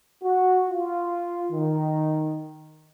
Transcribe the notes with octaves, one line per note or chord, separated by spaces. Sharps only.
F#4
F4
D#3